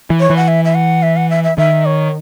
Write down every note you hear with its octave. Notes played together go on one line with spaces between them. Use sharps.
E3
C#5
E3
F#5
E5
E5
F#5
E5
F#5
E5
E5
D#3 E5
C#5